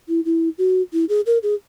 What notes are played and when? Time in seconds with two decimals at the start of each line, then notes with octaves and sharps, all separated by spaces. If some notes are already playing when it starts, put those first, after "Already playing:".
0.09 E4
0.25 E4
0.58 F#4
0.93 E4
1.09 G#4
1.26 A#4
1.43 G#4